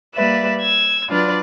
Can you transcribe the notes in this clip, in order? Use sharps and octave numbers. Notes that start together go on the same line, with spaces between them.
G3 A#3 B4 D5 E5
E6 G#6
F#3 D4 F4 B4 D5